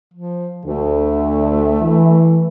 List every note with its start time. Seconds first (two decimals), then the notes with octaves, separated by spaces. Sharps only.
0.14 F3
0.66 D2 A3
1.82 E3